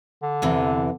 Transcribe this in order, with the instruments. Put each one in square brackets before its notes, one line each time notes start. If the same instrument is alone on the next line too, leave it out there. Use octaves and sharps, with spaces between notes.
[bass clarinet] D3
[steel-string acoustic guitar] E2 C3 E3